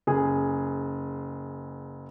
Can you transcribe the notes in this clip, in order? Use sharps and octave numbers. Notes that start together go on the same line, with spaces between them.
F#1 G#4